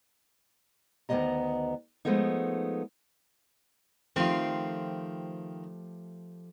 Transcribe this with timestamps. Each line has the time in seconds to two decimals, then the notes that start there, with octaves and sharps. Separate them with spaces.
1.09 D2 D#3 F#3 B3 D#5 A#5
2.05 F3 G#3 A3 B3 D#4
4.16 D#3 F3 A3 C4 F4 G4